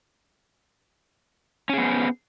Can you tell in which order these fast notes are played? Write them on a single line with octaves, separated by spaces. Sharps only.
C#4 G#4 B3 C5